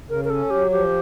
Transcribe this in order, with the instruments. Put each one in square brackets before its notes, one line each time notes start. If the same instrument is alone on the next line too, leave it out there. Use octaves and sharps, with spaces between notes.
[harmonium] C#3 [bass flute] A#4
[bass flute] A#4
[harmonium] C#4 [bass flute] A4
[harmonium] F#3 [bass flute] G4
[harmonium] F3 [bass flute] G4